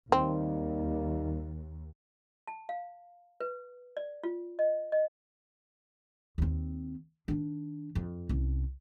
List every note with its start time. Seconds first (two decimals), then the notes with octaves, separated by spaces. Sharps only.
0.12 D#2 G3 A#3 C4 D#4
2.47 A5
2.69 F5
3.40 B4
3.97 D5
4.23 F4
4.59 D#5
4.92 D#5
6.38 D#2 C4
7.28 D#3 D4
7.95 F2
8.29 C2 C#4